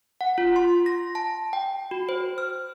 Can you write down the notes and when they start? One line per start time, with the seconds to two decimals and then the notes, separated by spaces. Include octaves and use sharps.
0.21 F#5
0.38 F4
0.56 C6
0.86 A#6
1.15 A5
1.53 G5
1.91 F#4
2.09 C5
2.38 F6